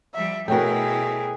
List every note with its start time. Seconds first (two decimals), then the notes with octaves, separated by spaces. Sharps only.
0.15 F3 G3 E5
0.48 B2 A3 E4 F#4 G#4 A#4 C#5 G5